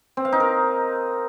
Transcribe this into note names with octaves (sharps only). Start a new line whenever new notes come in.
C4
F5
D#4
A#4